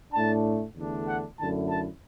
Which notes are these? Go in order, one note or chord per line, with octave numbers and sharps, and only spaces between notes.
A2 A3 D4 A5
E2 D3 A3 D4
F#5
F#2 D3 A3 E4 A5
A5